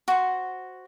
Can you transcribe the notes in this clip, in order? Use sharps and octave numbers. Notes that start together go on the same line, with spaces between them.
F#4 C5